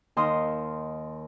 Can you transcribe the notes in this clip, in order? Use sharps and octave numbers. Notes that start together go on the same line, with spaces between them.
D#2 D#3 C6 D#6